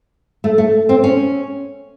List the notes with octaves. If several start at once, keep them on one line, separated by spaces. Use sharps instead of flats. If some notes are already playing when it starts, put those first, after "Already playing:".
A3
A3
C4
C#4